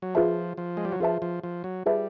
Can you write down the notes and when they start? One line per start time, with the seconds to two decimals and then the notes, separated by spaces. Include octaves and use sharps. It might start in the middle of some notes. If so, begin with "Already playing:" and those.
0.02 F#3
0.15 F3 F4 G#4 B4 E5 A5
0.57 F3
0.77 G#3
0.85 G3
0.92 F#3
1.00 F3 F4 G#4 B4 E5 A5
1.22 F3
1.43 F3
1.64 F#3
1.86 G3 F4 G#4 B4 E5 A5